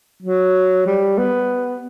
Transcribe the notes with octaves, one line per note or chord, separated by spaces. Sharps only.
F#3
G3
B3